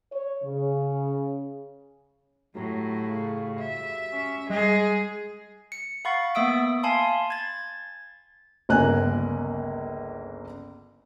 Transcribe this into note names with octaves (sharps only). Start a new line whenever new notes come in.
C#5
C#3
A2 F#3 F#4 G4
C#3
E5
C#4
G3 G#3 G#4
C#7
F5 F#5 B5 C#6 A6
A#3 B3 E5 D#6 E6 D7
F5 G#5 A5 B5 C6
G#6 A6
G1 C#2 A#3 A#4 G#5 F#6